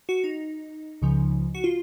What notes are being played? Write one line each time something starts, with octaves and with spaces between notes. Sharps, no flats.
F#4
D#4
C#2 C#3 F3
F#4
F4